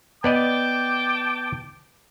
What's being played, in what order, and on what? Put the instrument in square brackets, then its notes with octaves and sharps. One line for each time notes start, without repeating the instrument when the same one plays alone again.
[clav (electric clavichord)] B3 D5 D#5 [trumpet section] G5 A5 D6